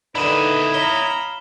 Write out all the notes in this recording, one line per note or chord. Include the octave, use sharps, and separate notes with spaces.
D3 D#3 E4 B4 D#5 B5 E7
C#5 F5 A#5 B5 G7